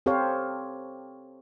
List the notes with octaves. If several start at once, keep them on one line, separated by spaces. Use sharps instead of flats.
C4 G4 A4 C5 C#5 F5